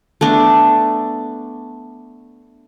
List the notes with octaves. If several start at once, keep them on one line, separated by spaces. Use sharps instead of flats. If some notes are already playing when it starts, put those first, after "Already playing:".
A3 B3 D4